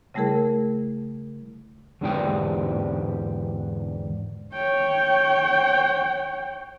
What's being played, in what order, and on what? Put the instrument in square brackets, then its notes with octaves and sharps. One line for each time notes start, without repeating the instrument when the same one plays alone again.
[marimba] C#3 G3 A3 E4 G#4 A#4
[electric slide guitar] E2 G#2 D3 D4 G4 G5
[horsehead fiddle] C#5 G5